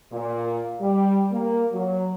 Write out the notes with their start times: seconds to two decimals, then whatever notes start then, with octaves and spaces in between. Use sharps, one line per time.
0.12 A#2
0.81 G3
1.31 A#3
1.72 F#3